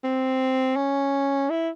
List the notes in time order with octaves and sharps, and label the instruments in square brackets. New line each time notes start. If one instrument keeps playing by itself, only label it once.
[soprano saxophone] C4
C#4
E4